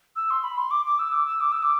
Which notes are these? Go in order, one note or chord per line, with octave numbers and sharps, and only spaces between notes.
E6
C6
B5
C6
D6
D6
E6
D6
E6
D6
E6
D6